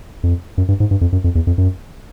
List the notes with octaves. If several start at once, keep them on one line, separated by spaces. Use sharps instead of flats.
F2
F#2
G2
G#2
G2
F2
F#2
F2
E2
F2
F#2